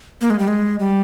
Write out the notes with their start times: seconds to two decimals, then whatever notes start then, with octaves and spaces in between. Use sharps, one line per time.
0.21 A#3
0.30 G#3
0.39 G3
0.48 G#3
0.80 G3